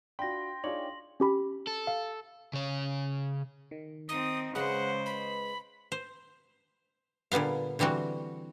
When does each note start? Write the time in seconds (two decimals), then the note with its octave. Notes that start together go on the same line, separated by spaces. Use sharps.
0.19 D4 F4 F#4 G5 B5 C6 A#6
0.64 D4 D#4 F4 G#4 C#5 D5 F#7
1.20 C#4 G4 B5
1.67 A4
1.87 F5
2.53 C#3 C#5
3.71 D#3
4.09 C4 D#4 D#6
4.55 C#3 G#3 B4 C5 D#5 F#5
5.06 B5
5.92 C5
7.32 A#2 D3 G3 B3 F5
7.79 D3 E3 G3 C4 F#4